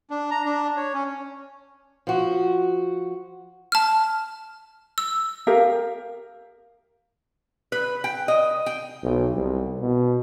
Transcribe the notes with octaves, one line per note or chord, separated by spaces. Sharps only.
D4
A#5
D4
C#5
C#4
F3 F#4
A5 F6
E6
G4 A#4 F5
B4
G5
D#5
G5
B1
C2
B2